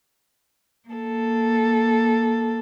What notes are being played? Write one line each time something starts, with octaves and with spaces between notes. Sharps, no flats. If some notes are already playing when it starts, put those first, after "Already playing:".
A#3 A4